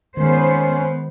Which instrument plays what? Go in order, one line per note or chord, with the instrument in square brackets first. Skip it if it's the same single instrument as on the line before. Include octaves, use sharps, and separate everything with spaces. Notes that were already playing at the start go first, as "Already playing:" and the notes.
[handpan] D#3 G#3 [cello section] B3 B4 C5 [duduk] C#4